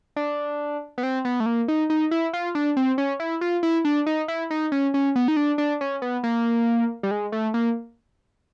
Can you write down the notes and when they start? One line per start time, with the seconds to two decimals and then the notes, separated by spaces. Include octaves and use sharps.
0.16 D4
0.98 B3
1.03 C4
1.25 B3
1.40 A3
1.46 A#3
1.68 D#4
1.90 D#4
2.11 E4
2.33 F4
2.55 D4
2.77 C4
2.98 C#4
3.20 E4
3.41 F4
3.63 E4
3.85 D4
4.06 D#4
4.28 E4
4.50 D#4
4.72 C#4
4.94 C#4
5.16 B3
5.28 D#4
5.37 D4
5.58 D4
5.81 C#4
6.02 B3
6.23 A#3
7.03 G3
7.11 G#3
7.32 A3
7.54 A#3